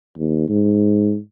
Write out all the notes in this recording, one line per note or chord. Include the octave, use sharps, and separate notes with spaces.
D#2
G#2